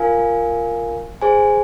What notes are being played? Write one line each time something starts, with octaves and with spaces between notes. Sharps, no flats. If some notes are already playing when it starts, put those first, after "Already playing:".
Already playing: F4 A#4 F5 G#5
G#4 C5 G#5